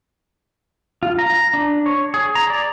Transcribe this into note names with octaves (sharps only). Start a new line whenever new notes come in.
F4
A#5
D4
C#5
G#4
A#5
D5